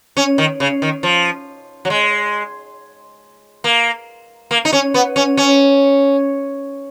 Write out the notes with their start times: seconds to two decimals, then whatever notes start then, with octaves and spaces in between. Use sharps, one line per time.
0.17 C#4
0.38 D#3
0.60 C#3
0.82 D#3
1.03 F3
1.85 F#3
1.90 G#3
3.64 A#3
4.51 A#3
4.65 D#4
4.73 C#4
4.94 B3
5.16 C#4
5.37 C#4